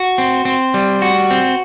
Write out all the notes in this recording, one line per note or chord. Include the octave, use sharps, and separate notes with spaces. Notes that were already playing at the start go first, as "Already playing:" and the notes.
Already playing: F#4
C4
C4
G3
F#4
C4